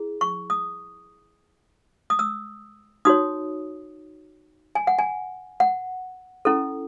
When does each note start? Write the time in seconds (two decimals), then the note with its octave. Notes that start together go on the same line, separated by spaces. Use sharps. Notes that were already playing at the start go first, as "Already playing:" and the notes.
Already playing: E4 G#4
0.21 C#6
0.50 D#6
2.10 D#6
2.19 E6
3.05 D#4 F#4 C#5 D#6
4.75 G#5
4.87 F#5
4.99 G#5
5.60 F#5
6.45 C#4 E4 A4